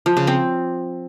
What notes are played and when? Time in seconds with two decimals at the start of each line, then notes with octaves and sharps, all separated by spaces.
0.06 F3
0.17 C#3
0.27 C4